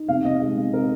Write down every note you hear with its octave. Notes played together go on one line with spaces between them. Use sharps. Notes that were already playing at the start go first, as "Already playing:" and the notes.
Already playing: D#4
C3 F5
C3 D#5
G#3
C3
C4 A#4